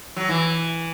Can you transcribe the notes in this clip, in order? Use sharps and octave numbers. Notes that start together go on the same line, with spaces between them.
F#3
E3